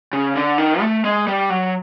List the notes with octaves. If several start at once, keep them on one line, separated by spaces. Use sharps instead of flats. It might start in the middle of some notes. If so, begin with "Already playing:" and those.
C#3
D3
D#3
A3
G#3
G3
F#3